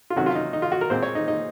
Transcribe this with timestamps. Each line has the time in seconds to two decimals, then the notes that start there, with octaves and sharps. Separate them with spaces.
0.10 F4
0.16 C3 D#3 F#3 C#4 F#4
0.26 F4
0.35 D#4
0.53 D#4
0.62 F4
0.72 F#4
0.81 A#4
0.90 A#2 G#3 C4 C5
1.03 C#5
1.15 D#4
1.28 D#4